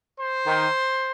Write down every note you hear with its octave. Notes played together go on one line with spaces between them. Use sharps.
C5
D#3